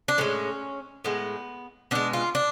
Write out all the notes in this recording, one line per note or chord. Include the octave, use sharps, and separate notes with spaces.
D4
A2 G#3 C#4
A2 G#3 B3
B2 G#3 D4
F4
D4